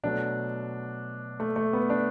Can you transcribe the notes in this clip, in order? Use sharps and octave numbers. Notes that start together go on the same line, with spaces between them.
B2 F#3 A3 D4
A3
A3
B3
D4